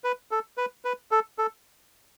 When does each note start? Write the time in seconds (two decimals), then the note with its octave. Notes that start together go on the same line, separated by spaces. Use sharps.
0.04 B4
0.31 A4
0.58 B4
0.85 B4
1.11 A4
1.38 A4